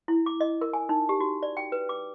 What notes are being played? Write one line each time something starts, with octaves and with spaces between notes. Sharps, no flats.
E4
D6
D#5
A#4
G#5
D#4
G4
F#4
D5
G5
B4
D6